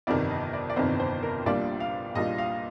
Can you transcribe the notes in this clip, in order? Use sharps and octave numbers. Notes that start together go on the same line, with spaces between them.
G1 F2 C3 D#3 D5
D#5
D5
D5
G1 F2 C3 D#3 C5
C5
A#4
A#1 A#2 G3 D4 F4 D5
F5
A#1 A#2 G3 D4 F4 D#5
F5